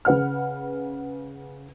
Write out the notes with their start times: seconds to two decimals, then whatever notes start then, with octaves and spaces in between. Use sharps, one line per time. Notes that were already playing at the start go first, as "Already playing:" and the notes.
0.05 C#3 B4 F#5 F6